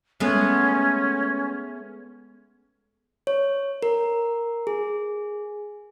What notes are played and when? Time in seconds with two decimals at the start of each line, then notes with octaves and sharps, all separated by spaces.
0.20 G#3 A3 B3 C#4
3.27 C#5
3.83 A#4
4.67 G#4